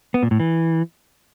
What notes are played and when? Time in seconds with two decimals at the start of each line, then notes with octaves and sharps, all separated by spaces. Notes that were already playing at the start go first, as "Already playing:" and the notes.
0.14 B3
0.23 A#2
0.31 A2
0.40 E3